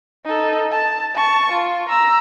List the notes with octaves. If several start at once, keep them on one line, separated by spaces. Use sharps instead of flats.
D#4 A4
A5
A5 C#6
F4
A#5 E6